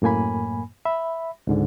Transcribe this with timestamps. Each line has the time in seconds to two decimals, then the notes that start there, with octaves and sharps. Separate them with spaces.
0.02 F#2 A2 A#3 G#5 B5
0.85 E5 B5
1.47 C#2 G#2 D3